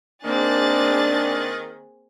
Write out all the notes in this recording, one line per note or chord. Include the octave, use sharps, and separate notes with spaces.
D#3 A#3 C4 D4 G#4 F#6 A6